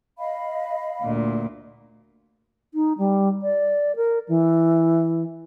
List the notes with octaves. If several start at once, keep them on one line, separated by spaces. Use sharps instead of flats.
D#5 F5 B5
D2 A#2
D#4
G3
D5
A#4
E3